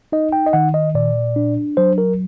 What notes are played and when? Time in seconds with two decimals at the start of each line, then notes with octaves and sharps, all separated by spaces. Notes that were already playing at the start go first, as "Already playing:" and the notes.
0.12 D#4 D#5
0.32 G5
0.47 D#5
0.53 D#3 F#5
0.74 D#5
0.95 A#2 D5
1.36 D4
1.77 F#3 C5
1.98 A#4